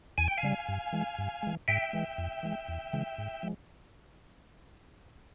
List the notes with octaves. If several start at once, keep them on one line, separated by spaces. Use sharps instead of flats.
E2 G#5
G5
F5 G#5
C#3 G3
G2
E3 G#3
G2
E3 G#3
G#2 E5 G5
E3 G#3
F2
E3 G#3
E2
C#3 E3 G#3
G#2
F3 G#3